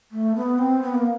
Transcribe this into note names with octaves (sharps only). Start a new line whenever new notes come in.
A3
B3
C4
B3
A#3